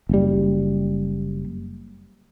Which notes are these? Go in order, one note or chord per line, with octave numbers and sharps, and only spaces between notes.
F#1 G3